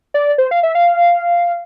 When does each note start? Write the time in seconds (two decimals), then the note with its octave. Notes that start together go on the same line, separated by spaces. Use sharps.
0.14 D5
0.38 C5
0.51 F5
0.63 E5
0.75 F5